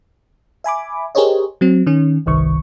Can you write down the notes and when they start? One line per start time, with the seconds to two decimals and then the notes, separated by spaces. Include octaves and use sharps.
0.64 E5 G#5 B5 D6
1.15 G4 G#4 A#4 C5 C#5 D#5
1.61 F#3 C4
1.86 D#3 C#4
2.26 G1 C2 D#3 C#6